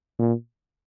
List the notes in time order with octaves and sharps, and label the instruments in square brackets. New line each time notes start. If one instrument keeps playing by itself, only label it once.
[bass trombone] A#2